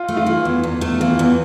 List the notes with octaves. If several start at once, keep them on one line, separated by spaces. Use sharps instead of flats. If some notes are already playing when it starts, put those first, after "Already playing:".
Already playing: F4
A3
F4
E3
E2
E2
A3
E3 F4
E2